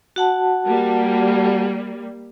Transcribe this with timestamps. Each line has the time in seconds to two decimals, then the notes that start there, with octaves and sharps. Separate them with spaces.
0.16 F#4 F#5 A5
0.67 G3 A#3